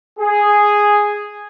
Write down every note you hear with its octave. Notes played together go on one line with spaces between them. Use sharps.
G#4